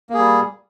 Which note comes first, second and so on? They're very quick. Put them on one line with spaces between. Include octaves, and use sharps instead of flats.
A#3 G#4 G3